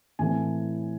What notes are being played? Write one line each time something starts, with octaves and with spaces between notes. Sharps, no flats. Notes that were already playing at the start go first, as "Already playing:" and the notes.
A2 E3 A3 C4 G#5